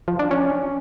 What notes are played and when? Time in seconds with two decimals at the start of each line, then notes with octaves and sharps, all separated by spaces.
0.08 F3
0.19 D4
0.31 C#4